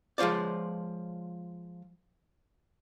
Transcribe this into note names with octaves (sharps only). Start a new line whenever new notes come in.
F3 G#3 F4 C5 D5